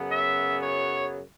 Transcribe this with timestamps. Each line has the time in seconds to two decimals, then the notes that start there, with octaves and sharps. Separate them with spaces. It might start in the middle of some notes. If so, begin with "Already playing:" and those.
Already playing: F#2 C#3 F#3 B3
0.11 E5
0.61 C#5